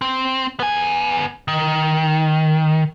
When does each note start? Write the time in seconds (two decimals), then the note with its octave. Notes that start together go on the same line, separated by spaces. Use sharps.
0.01 C4
0.60 B3 G#5
1.48 D#3